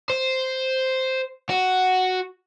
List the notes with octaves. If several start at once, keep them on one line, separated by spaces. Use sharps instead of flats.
C5
F#4